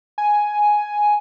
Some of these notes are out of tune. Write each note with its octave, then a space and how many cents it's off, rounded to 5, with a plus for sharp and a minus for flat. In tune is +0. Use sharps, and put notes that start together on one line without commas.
G#5 +5